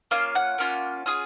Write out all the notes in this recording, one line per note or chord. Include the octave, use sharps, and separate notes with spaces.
A#3 C#4 F4 F5
F#5
A#3 C#4 F4
C#4 F4 G#4